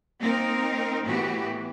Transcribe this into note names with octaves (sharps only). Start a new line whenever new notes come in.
A#3 C4 D#4 A#4
A2 E3 B3 F#4 G4